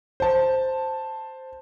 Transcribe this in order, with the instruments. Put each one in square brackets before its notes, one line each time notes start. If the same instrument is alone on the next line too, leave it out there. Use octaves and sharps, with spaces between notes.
[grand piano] C5 A5